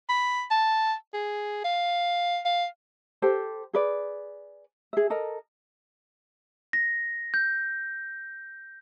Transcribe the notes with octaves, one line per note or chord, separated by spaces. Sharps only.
B5
A5
G#4
F5
F5
G4 A4 C5
G#4 B4 D5
G#4 E5
A4 A#4 D#5
A#6
G6